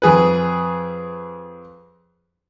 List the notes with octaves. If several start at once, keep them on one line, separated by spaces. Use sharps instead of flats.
F2 G#4 B4